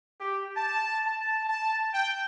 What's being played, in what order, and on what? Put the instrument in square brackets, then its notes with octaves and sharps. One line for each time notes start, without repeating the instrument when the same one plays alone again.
[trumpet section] G4
A5
A5
A5
G5